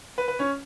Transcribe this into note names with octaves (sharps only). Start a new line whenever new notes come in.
B4
B4
C#4 C#5